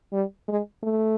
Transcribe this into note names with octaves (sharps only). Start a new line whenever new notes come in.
G3
G#3
A3